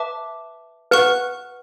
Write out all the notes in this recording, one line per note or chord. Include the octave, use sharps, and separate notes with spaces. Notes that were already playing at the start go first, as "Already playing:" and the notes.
Already playing: B4 E5 A5 D6
B4 F#5 C#6 F#6